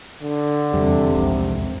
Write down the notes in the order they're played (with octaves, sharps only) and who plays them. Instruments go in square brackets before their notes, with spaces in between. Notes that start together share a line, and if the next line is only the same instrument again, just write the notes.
[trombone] D3
[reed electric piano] E2 [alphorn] C3 [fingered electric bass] G3
[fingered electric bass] C2 F2 G#2